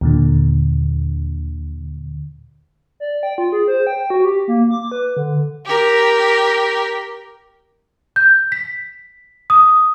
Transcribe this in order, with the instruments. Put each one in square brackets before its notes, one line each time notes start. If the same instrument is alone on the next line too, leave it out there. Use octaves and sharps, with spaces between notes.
[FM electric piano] D#2 A#2 D3
[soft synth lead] D5
G5
F4
G#4
C5
G5
F#4
G4
A#3
D6
B4
D3
[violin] G4 A#4
[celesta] G6
B6
D#6